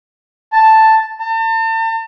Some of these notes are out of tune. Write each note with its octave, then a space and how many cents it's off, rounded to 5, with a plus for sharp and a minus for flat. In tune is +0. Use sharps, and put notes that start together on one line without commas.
A5 +5
A5 +40